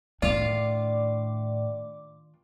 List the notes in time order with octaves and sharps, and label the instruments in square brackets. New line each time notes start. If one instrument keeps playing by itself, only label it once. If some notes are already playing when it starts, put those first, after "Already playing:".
[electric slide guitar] A2 [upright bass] D#3 D4 [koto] F4 F5 [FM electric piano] D5 D6